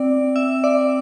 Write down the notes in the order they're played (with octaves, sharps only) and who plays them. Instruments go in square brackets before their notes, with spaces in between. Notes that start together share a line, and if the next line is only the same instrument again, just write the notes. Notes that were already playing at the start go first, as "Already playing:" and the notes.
Already playing: [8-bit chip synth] C4 [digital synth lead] D5
[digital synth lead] E5
D5